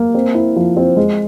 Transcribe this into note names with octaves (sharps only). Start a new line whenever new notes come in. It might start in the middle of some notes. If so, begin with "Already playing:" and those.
Already playing: A#3
C4
E4
F3
C4
G#3